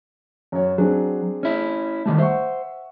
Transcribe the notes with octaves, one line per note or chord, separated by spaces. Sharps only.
F#2 C#5
F#3 C4 D4 G#4
C#4 E4
D#3 G3 A3
C5 E5 F#5 C#6